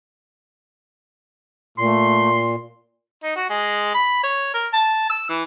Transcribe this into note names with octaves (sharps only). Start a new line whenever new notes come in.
A#2 A3 C6
D#4
F#4
G#3
B5
C#5
A#4
A5
E6
E3